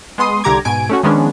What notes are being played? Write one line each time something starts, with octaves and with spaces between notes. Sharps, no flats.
G#3 B3 C6 D#6
C2 D3 G4 A#5 D6 G#6
G#2 B2 G#5 D7
A3 C#4 F#4
D#3 F3 G#3 B3 C#4 D4